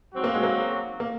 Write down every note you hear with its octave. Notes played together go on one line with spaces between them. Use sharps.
G#2 F#3 C4 F#4
A#3
G#3
A#3
A#3